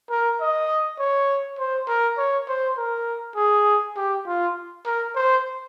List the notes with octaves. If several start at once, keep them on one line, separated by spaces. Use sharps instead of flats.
A#4
D#5
C#5
C5
A#4
C#5
C5
A#4
G#4
G4
F4
A#4
C5